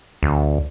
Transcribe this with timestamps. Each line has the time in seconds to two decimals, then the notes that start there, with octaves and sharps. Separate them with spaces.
0.23 D2